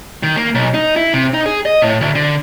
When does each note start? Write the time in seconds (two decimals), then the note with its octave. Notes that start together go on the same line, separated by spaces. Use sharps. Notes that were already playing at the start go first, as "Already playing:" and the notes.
0.23 D#3
0.36 A#3
0.54 B1
0.74 D#4
0.96 E4
1.14 C3
1.34 D#4
1.46 G#4
1.65 D#5
1.82 A2
2.01 D2
2.15 D3